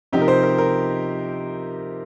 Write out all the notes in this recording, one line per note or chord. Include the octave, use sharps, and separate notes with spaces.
C3 F3 C4 D#4 G4
A#4
C5
A#4
A#4